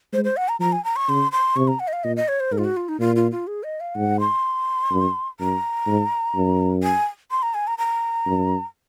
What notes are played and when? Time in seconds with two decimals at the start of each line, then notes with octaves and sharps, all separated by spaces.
0.12 G#3 C5
0.24 C5
0.37 F#5
0.49 A#5
0.60 F3 A#5
0.72 G#5
0.85 A#5
0.96 C#6
1.09 C#3 C6
1.32 C6
1.56 C3 C#6
1.68 A#5
1.80 F#5
1.88 D#5
1.93 F5
2.04 A#2 D#5
2.17 D#5
2.28 C#5
2.40 C5
2.52 G#2 A#4
2.58 F4
2.64 F#4
2.77 F4
2.89 D#4
3.00 A#2 F4
3.16 F4
3.31 F4
3.47 G#4
3.63 D#5
3.80 F5
3.95 G#2 F#5
4.20 C6
4.91 F#2
5.40 F#2 A#5
5.87 G#2
6.35 F#2
6.83 G#5
7.31 C6
7.43 A#5
7.54 G#5
7.67 A#5
7.78 A#5
8.26 F#2